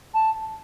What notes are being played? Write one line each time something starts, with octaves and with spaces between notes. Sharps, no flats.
A5